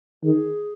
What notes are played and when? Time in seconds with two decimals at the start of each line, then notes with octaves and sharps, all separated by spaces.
0.24 D#3 G#4